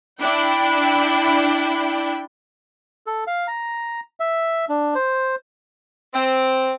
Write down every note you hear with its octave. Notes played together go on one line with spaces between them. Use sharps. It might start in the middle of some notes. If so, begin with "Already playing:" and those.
D4 E4 G5
A4
F5
A#5
E5
D4
C5
C4